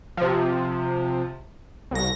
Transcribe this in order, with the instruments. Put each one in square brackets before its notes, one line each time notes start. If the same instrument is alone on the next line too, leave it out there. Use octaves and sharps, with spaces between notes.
[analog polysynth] C3 F3
C2 A#6